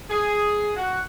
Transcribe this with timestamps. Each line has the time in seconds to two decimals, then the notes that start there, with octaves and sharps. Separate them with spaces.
0.10 G#4
0.76 F#4